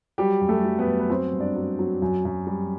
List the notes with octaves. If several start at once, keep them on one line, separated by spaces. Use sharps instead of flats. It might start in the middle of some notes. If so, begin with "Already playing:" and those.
F#3 G3 G4
F#2
A3 A4
F#3
B3 B4
F#2
B4
F#3 C4 C5
G2
D4 D5
F#3
F#3
F#2
F#2
G3